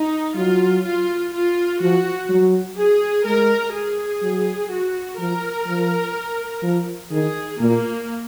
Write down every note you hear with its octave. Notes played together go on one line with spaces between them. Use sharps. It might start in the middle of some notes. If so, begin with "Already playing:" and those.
Already playing: D#4
F#3 F4
F4
F4
F3 F#4
F#3
G#4
G#3 A#4
G#4
F#3
F#4
F3 A#4
F3
F3
D#3 G#4
A#2 A#3